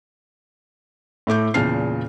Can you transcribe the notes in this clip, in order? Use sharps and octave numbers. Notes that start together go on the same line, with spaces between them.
A2 A3 D6 G6
E2 A#2 C#3 A5 F6 C7